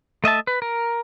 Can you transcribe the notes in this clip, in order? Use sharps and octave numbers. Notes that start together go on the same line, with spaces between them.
A3 D#5 E5 A5
B4
A#4